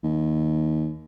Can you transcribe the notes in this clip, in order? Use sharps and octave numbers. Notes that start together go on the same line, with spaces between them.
D#2